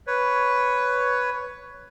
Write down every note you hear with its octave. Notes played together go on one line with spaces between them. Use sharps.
B4 C#5